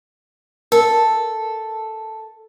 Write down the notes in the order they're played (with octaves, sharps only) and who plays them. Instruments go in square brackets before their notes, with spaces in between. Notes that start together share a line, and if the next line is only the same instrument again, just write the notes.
[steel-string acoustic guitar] A4 [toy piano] A#4